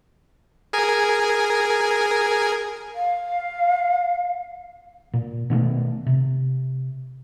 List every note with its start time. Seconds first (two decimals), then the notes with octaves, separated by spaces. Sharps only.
0.73 G#4 A#4 G#5
2.95 F5
5.14 A#2
5.50 B2 D#3 F#3 A3
6.06 C3